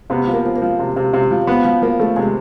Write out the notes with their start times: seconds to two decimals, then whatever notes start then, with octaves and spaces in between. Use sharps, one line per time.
0.10 C3 B3
0.27 F3
0.33 A#3
0.45 F3
0.56 A#3
0.62 F3
0.79 C3
0.96 C3
1.13 C3
1.31 F3
1.47 F3 B3
1.65 F3
1.82 F3 A#3
1.99 F3 A3
2.16 C3 G#3